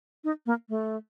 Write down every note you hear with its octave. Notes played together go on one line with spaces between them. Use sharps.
D#4
A#3
A3